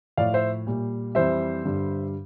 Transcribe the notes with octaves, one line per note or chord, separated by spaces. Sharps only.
A2 F3 D5 F5
C5 E5
A#2 G3
F2 E3 G3 C5 E5
G2 D3 G3